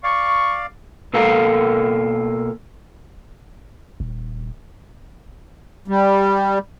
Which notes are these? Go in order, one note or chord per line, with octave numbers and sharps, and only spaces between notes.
D5 F5 C#6
B2 A#3 A4 A#4 F5 A#5
D#1
G3